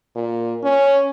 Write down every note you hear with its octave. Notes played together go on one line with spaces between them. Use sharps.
A#2
C#4